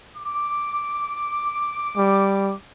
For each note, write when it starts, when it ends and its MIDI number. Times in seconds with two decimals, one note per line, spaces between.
0.16 2.59 86
1.97 2.54 55